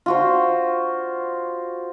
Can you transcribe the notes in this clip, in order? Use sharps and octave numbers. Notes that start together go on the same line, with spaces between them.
F4 F#4 C5